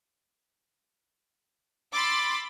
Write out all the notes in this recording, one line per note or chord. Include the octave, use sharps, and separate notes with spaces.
B5 C6 D6 E6 A6